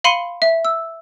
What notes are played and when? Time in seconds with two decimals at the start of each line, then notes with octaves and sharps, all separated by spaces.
0.04 F5 B5 C6 C#7 D#7 G7
0.42 E5
0.65 E6